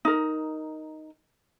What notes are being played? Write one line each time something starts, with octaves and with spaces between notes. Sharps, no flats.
D#4 A#4